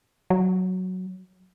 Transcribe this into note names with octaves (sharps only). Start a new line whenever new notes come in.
F#3